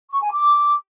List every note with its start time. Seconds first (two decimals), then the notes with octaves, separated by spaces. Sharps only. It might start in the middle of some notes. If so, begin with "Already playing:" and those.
0.11 C#6
0.22 G#5
0.32 D6